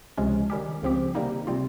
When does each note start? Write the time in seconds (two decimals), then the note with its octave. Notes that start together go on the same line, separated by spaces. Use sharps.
0.18 C#2 C3 F3 G#3 C#4
0.50 D#3 G3 C#4 G4
0.82 C#2 C#3 F3 C4 G4
1.15 C3 D#3 G3 A#3 D#4
1.47 C3 G3 C4 F4